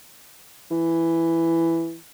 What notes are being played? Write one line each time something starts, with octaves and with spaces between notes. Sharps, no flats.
E3